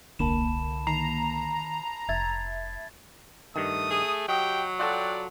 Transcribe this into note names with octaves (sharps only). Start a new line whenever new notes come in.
D#1 C2 D3 A#3 A5 B5 E7
D#3 A#5 C7 F7
F1 E5 G#6 A6
G2 D#3 A3 D#6
G#4
F#3 G4 D#5 G5
F4 F#4 A4 D5 G5